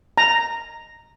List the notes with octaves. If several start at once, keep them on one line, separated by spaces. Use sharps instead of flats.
A#5